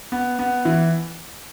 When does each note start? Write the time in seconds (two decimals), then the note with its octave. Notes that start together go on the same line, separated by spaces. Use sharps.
0.12 B3
0.39 B3
0.65 E3